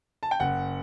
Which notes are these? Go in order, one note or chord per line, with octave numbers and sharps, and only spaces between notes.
A5
G5
F#1 F#5